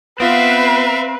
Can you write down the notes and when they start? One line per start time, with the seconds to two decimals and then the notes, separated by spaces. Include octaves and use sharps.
0.20 B3 C4 F4 B4 E5 F5